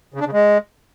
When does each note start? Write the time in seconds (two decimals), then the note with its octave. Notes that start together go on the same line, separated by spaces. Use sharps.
0.14 C#3
0.20 D4
0.27 C#3
0.33 G#3